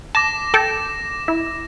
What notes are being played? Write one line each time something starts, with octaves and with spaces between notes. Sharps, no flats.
A5 D6 A#6 E7
A4 G5 A5
E4